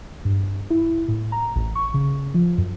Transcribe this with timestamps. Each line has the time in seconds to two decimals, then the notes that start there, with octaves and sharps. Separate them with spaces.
0.25 G2
0.70 E4
1.08 A2
1.32 A#5
1.56 A1
1.75 C#6
1.94 C#3
2.34 F3
2.58 F#2